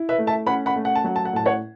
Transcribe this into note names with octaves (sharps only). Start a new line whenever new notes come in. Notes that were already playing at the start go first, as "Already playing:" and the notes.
Already playing: E4
B4 E5
A3
E5 A5
C#4 F#5 B5
F#5 B5
A3
F#5
A5
F#3 F#5
A5
F#5
A2 A5
C#5 F#5